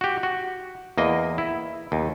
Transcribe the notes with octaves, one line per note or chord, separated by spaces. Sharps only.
F#4 G4
F#4
E2 A#3 D#5
E4
D#2